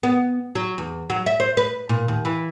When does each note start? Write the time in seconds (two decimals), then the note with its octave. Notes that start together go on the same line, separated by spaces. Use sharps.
0.03 B3
0.55 F#3
0.78 E2
1.10 F#3
1.26 E5
1.40 C5
1.57 B4
1.89 A#2
2.08 D#2
2.25 E3